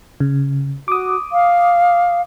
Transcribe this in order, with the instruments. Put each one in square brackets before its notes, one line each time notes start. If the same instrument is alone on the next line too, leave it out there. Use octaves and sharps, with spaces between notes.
[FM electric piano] C#3
[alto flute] F#4 [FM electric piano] D6 D#6
[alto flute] F5